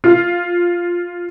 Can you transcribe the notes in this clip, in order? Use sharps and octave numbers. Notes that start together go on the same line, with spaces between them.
F4